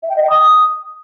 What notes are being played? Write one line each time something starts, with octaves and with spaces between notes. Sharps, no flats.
E5
G5
D#5
G5
D#6